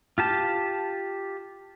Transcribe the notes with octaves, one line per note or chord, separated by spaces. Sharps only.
F4 G4 A5